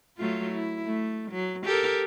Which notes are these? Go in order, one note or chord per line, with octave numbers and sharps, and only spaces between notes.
F#3 A3 F4
E4
A3
F#3
G4 A4 A#4